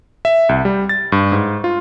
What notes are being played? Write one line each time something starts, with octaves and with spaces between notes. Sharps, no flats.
E5
C2
G3
A6
G2
G#2
F4